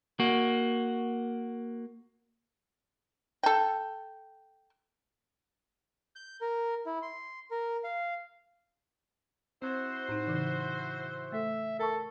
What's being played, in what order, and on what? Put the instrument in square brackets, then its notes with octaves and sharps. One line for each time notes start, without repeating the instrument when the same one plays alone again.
[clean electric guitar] A#3 F#4
[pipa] A4 G5
[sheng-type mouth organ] G6
A#4
E4
C6
A#4
F5
[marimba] C4 [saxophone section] E4 F#4 C5
[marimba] A2 D#4
C#3 E3
[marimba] A3 A4 [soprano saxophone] E5
[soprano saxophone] A4 [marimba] A#4 A5 C#6